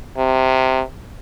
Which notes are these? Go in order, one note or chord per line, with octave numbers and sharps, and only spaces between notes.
C3